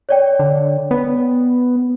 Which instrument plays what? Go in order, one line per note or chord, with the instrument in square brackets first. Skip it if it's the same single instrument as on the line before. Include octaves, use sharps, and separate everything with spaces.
[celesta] C#5 D5 G5
[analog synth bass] D3
B3